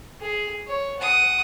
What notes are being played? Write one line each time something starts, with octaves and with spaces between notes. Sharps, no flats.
G#4
C#5
F#5 D#6